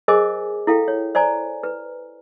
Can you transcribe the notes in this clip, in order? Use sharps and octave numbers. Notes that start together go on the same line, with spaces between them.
G#4 A#4 C5 D#5 G#5 D6
E4 A4 F5 G5
C#5
C5 D5 G#5 A#5
B4